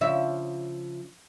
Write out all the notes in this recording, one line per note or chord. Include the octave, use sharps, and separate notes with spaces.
C#3 F3 E5